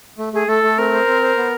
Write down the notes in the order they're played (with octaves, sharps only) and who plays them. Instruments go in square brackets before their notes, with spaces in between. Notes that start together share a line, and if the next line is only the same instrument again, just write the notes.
[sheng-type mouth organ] A3
[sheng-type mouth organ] A3 [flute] G#4
[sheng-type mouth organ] A3 [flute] A4
[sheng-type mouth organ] A3
[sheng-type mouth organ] C4 [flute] A#4
[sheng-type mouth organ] C5
C4
C5
B3